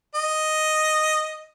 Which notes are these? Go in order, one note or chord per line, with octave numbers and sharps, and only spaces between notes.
D#5